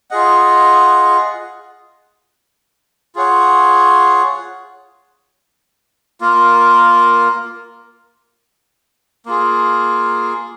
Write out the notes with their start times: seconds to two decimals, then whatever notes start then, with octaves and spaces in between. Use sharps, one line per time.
0.11 F4 G#4 D#5 F#5
3.15 F4 G#4 C#5 F#5
6.21 A#3 F4 A#4
9.26 A#3 F4 G#4